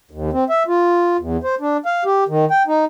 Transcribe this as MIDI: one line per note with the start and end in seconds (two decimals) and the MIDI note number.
0.11 0.30 39
0.33 0.44 60
0.50 0.63 76
0.68 1.17 65
1.20 1.37 40
1.44 1.55 72
1.61 1.77 62
1.86 2.04 77
2.05 2.24 67
2.29 2.45 51
2.50 2.63 79
2.67 2.85 63